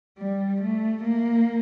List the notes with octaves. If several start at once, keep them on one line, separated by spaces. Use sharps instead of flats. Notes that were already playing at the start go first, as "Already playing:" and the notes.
G3
A3
A#3